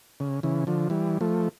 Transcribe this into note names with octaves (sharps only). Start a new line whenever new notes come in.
C#3
C#3 E3
D3 F3
E3 G3
F3 A3